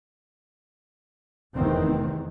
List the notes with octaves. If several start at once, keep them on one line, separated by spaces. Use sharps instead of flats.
F1 E2 C3 D#3 C4